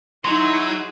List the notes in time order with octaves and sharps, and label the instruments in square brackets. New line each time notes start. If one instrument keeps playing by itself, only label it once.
[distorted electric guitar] F#3 [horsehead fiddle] D#4 [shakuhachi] E4 [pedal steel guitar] F#4 G#4 C6